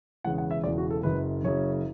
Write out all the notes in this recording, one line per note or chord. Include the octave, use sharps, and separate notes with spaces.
E1 E2 C#3 F#5
F#5
E5
E1 E2 C#3 D5
F#4
A4
F#1 F#2 C#3 B4
F#1 F#2 C#3 C#5